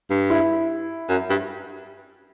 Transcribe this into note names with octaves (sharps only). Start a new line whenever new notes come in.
G2
E4
F#2
G2